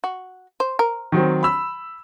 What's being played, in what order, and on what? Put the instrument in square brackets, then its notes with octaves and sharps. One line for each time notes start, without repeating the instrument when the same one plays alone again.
[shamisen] F#4
C5
A#4
[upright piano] D#3 F#3 C4
B5 E6